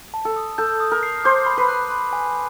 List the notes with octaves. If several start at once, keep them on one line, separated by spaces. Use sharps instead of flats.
A5
A4
D#6
A4 G6
D#6
A#4
C7
C5 D6
B5
B4
F#6
C6
G#5